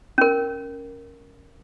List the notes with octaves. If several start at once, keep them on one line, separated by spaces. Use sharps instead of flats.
C#4 A#4